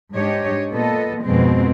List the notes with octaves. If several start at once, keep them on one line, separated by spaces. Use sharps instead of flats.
G#2 D4 G4 C#5 D#5
A#2 B3 A4 D#5
F2 G#2 B2 G#3 C4